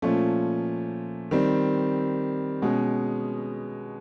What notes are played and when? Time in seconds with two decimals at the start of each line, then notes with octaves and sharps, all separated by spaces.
0.02 A#2 F3 A3 C#4
1.31 D#3 G3 C4
2.62 B2 G#3 C#4